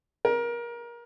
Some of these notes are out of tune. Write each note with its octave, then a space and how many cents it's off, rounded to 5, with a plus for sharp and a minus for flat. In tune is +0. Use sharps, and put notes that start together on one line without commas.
A#4 +25